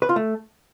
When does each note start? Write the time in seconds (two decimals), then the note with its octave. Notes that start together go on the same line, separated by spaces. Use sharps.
0.02 B4
0.09 F4
0.16 A3